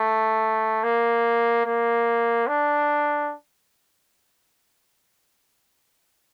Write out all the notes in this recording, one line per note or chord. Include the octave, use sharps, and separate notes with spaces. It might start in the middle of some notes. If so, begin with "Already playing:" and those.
Already playing: A3
A#3
A#3
D4